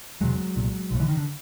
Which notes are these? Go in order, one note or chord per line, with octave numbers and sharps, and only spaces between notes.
E1 D2 C3 F#3 G#3
C2 A#2
B1 A2
D3 E3
D#3
D3